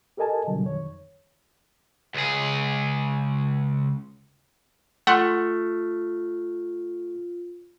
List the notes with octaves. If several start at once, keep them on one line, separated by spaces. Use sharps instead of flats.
G4 A4 A#4 D#5 G#5 A5
B2 D3 F#3 G3
F2 D#3 C#5
C#2 G#4
A3 F4 F#5 C6